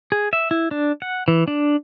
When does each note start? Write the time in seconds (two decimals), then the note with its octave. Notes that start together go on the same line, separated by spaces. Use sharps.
0.12 G#4
0.33 E5
0.51 E4
0.71 D4
1.02 F#5
1.28 E3
1.48 D4